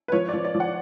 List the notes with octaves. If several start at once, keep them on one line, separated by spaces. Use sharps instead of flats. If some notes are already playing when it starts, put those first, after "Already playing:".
B4
F3 C#5
F3 D5
D5
F3
F#5